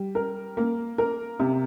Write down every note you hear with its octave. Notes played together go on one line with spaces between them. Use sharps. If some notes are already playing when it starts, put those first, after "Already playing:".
Already playing: G3
A#4
A#3
A#4
C3